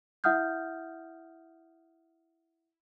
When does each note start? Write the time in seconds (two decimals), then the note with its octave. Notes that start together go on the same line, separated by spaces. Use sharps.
0.24 E4 E5 F#5 D#6 F6 G6